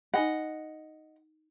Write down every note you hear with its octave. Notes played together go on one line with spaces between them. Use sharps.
D#4 D#5 F#5 G#5 B5